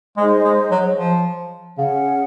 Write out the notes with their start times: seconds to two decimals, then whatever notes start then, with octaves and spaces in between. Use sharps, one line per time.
0.17 G#3 D#4 G#4 C5 D#5
0.43 G#3
0.71 F#3
0.97 F3
1.78 C#3 C#4 G#4 C#5 F#5